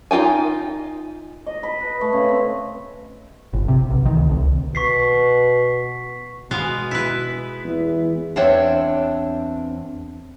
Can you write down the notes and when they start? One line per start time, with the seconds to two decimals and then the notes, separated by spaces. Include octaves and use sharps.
0.11 D#4 F4 G5 G#5
1.46 D#5
1.63 B5
1.80 B4
2.01 A3
2.13 C#3
2.29 C4
3.53 G1
3.68 C3
3.90 B1
4.06 D#3
4.17 D2
4.31 C2
4.75 B2 C#6 B6 C7
6.51 B2 G#3 B3 F5
6.91 E4 B4
7.64 E2
8.36 E2 C4 D4 C5 C#5 E5